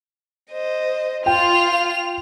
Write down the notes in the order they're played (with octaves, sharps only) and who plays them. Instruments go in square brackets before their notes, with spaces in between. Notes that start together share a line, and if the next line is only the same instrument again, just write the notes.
[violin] C5 D#5
[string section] F4 [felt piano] G5 [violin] F7